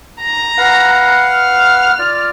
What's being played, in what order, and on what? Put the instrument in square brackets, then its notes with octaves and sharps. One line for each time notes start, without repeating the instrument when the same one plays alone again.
[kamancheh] A#5
[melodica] B4 F5 F#5
[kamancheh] F6
[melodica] F4 D5